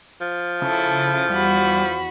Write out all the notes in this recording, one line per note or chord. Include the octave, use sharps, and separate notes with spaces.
F3
C#3 E4 A4
E2 G3 F#4 B5